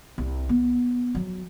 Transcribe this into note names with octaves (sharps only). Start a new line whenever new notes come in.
C2
B3
F#3